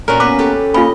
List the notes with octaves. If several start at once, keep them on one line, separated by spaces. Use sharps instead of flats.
A#2 C#4 F#4 A#4
A#3 B3 C#4 B4 D6
G4 A4
A#3 C#4 F4 D#5 B5